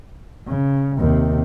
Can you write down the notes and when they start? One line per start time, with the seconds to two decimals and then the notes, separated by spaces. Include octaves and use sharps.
0.48 C#3
0.99 D#2 C3